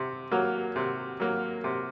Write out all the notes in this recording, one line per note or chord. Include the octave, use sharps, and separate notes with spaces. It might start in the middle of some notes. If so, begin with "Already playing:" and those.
Already playing: C3
F#3 A#3
C3
F#3 A#3
C3